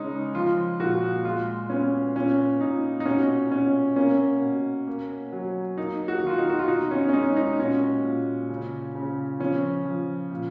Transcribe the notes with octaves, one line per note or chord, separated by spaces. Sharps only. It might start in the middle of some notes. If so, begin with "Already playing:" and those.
Already playing: C#3 G#3 C#4 D#4
F3 F4
A#2 F#4
G#3 F4
B3 C#4
A#2 C#4
A#2 D#4
D#4
B2 C#4
B2 C#4
A#3 C#4
B2
A#3
F#3
A#3 D#4
F#4
D#3 F4
D#4
F#4
F4
B2 D#4
C#4
C#4
G#3 D#4
D#4
A#2 C#4
A#2
C#3
C#3
F3 C#4
F3
A#2